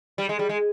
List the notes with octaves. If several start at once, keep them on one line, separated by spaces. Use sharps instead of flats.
G3
G#3
G3
G#3